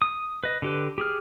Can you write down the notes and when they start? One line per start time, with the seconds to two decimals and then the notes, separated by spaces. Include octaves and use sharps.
0.02 D#6
0.44 B4 D#5
0.62 D3 G4 B4
0.98 G4 G#4 F6